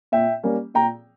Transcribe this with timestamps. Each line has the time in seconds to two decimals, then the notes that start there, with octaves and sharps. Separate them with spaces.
0.12 A#2 E5 G5
0.43 G3 A#3 C#4
0.74 A#2 G5 A#5